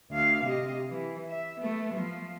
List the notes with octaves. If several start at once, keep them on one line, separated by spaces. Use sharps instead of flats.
D2 F5
C3 D#5
E3
E5
A3 B3
F3